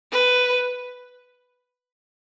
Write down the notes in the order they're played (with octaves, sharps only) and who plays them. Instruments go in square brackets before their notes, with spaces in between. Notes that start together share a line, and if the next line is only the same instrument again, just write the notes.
[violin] B4